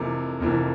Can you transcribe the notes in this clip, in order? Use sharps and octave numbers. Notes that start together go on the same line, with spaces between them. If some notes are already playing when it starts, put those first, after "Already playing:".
Already playing: F1 F2 C3 E3 A#3
F1 F2 C3 E3 A#3